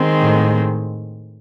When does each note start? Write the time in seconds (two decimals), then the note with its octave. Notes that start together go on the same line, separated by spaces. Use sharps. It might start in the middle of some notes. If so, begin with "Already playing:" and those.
Already playing: D#3 G#3 C4
0.20 A2